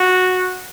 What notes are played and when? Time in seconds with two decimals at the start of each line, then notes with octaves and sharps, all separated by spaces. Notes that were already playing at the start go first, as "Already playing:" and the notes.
Already playing: F#4